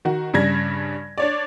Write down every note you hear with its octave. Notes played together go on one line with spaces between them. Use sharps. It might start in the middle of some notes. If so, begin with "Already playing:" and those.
D#3 F#4
G2 C#3 G3 G#6 A#6
D4 C#5 D5